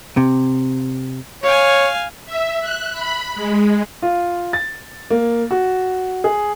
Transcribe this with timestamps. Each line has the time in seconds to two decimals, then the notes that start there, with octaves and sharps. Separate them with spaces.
0.17 C3
1.44 C#5 F5 G#5
2.26 E5
2.61 F#6
2.92 B5
3.34 G#3
4.02 F4
4.53 A6
5.11 A#3
5.51 F#4
6.24 G#4